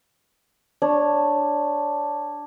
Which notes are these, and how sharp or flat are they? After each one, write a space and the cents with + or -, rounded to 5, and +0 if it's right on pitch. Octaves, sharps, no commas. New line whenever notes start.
D4 +0 C#5 -10